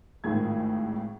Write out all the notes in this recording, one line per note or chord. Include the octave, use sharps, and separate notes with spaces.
G#1 A2 D#3 F3 G#4 G#6